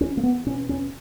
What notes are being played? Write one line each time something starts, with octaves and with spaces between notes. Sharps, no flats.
E2 C#4
A#3
B3
B2 C#4
C#4